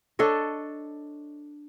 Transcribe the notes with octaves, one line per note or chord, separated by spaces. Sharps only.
D4 A4 C#5 D#5